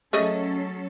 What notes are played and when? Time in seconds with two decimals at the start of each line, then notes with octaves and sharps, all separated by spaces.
0.13 F#3 A3 C#4 G#4 A4 D#5